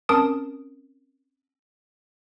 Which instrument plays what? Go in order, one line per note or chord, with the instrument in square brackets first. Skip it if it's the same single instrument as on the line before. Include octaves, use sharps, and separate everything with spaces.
[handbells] C4 C#4 A#4 A5 D#6 D7